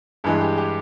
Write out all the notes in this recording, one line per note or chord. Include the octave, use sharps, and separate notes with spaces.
G2 E3 G#3 G#4
G4
G4